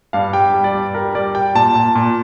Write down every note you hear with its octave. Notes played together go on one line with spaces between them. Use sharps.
G2 F5
G3 G5
G3
D5
G2
G3 A#4
G3 D5
G3 G5
A#2 A5
A#2
A#2